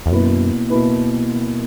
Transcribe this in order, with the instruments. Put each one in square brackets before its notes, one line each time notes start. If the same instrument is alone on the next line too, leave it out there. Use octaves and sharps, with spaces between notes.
[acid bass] E2
[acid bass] F#2 [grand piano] B2 A#3 E4 B4
[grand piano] B2 A#3 E4 B4